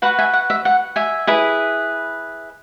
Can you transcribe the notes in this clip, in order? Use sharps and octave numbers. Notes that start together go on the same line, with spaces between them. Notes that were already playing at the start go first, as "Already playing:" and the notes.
F#4 B4 F#5 B5
E5 G#5
F#5
E5
F#5
E5 G#5
E4 G#4 B4